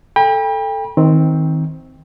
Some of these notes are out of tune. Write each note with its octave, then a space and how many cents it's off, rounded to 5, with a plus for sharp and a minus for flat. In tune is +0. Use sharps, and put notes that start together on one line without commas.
A4 +0 G5 +35 B5 -35
D#3 +25 C4 +0